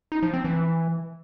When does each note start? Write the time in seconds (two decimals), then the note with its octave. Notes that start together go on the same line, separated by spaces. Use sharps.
0.12 D#4
0.23 F3
0.33 C4
0.44 E3